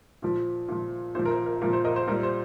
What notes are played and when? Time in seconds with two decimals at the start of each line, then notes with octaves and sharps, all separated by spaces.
0.22 A#2 F3
0.68 A#2 F3
1.15 A#2 F3 C5
1.25 A#4
1.31 C5
1.46 A#4
1.62 A#2 F3 A#4
1.73 C5
1.84 A#4 D#5
1.96 C5
2.07 A#2 G3 A#4
2.23 C5